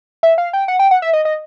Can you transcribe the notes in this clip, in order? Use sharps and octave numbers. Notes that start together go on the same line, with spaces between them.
E5
F5
G5
F#5
G5
F#5
E5
D#5
D#5